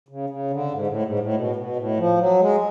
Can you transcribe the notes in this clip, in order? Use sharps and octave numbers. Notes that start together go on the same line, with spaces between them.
C#3
C#3
D3
G#2
A2
G#2
A2
B2
B2
A2
F3
F#3
G#3